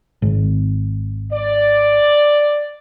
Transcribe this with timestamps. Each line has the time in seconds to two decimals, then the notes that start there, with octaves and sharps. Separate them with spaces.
0.22 G#1
1.32 D5